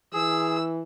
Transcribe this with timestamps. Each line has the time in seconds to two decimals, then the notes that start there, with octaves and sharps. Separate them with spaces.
0.13 E3 G#4 E6